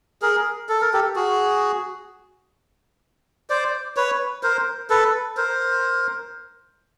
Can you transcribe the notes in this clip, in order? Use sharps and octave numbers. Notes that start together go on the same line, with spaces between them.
G#4 A#4
A4
A#4
G4 A4
F#4 G#4
C5 D5
B4 C#5
A#4 C5
A4 B4
A#4 C5